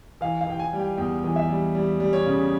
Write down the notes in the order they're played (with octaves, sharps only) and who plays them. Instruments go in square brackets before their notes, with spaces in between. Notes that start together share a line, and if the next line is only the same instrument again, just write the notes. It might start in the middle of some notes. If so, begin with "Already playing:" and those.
[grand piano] E3 F5
F5
E3 G5
G#5
G3
G5
E2 G5
E3
E5
G3
G3
G3
C#5
C#3